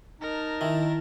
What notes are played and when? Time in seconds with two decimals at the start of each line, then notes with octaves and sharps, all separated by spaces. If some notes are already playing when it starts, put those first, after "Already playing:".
0.21 D#4 A#4 A5
0.61 D#3 E4